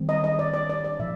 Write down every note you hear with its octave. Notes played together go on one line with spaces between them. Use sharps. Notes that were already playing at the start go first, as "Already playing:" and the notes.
Already playing: D#3 G3 C4
D#5
D#5
D5
D5
D5
D5
A#2 F3 E5